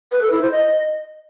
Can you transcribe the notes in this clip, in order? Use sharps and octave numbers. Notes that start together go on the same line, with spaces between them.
B4
A4
E4
C5
D#5